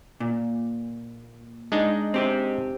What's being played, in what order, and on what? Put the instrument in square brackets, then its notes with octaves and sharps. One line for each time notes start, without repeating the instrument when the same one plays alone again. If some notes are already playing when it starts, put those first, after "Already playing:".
[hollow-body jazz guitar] A#2
[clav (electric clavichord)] G#3 D4 D#4
[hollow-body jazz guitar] C4 G4 C5